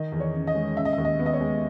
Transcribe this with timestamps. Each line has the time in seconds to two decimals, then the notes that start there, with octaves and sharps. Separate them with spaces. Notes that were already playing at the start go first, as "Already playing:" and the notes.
Already playing: D#3 D#5
0.12 E2
0.20 C#5
0.34 C#4
0.47 D#5
0.55 G#3
0.76 C#3 E5
0.85 D#5
0.93 E5
0.98 D#2
1.05 D#5
1.19 B3
1.26 D#5
1.33 C#5
1.41 G#3